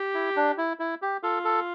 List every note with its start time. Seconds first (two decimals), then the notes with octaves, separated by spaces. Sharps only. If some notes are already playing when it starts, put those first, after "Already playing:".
Already playing: G4
0.14 E4
0.36 D4
0.58 E4
0.79 E4
1.02 G4
1.23 F4 A4
1.45 A4